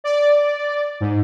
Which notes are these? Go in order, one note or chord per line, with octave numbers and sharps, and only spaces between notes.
D5
G#2